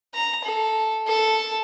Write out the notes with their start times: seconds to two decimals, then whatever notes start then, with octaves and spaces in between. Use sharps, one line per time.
0.14 A#5
0.45 A4
1.07 A4